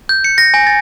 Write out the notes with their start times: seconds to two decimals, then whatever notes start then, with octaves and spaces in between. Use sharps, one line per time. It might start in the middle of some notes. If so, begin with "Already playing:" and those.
0.09 G6
0.24 C#7
0.38 A#6
0.54 G#5
0.67 A6